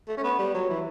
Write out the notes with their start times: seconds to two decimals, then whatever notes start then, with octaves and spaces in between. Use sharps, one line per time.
0.08 A3
0.17 C#4
0.24 B3
0.39 G3
0.54 F#3
0.69 E3